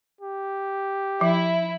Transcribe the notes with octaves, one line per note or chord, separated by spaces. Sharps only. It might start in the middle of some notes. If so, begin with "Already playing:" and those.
G4
F3 E4 E5